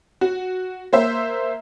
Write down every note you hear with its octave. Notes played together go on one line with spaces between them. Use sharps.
F#4
A#3 C5 E5